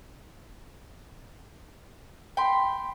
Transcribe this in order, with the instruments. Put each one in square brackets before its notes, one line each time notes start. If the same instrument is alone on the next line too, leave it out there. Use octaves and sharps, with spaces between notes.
[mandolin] G5 B5 C6